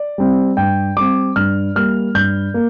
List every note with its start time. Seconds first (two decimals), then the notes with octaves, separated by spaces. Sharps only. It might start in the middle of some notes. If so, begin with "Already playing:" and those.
Already playing: D5
0.18 G3 C4
0.57 G2 G5
0.97 G3 C4 D6
1.36 G2 F6
1.75 G3 A#3 F6
2.14 G2 G6
2.54 A#3